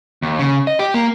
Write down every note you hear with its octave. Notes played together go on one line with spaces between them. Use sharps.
D#2
C#3
D#5
G4
A#3